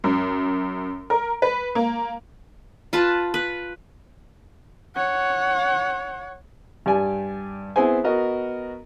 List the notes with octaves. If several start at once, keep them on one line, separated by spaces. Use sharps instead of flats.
F#2
A#4
B4
A#3
F4 B4 A5
B4
C#5 F#5
G2 G4 D5 G#5
B3 C4 E4 G#4 C5 G#5
B3 F#4 A#4 D#5